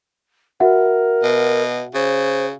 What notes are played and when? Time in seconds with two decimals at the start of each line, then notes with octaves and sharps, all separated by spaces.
0.60 F#4 A#4 E5 F#5
1.23 B2
1.94 C#3 C5